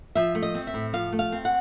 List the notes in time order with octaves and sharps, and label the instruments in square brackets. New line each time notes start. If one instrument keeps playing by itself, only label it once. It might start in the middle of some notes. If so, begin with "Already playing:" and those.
[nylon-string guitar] F3 E5
A3
D#5
C4
E5
A2
F3 F5
A3
F5
C4
F#5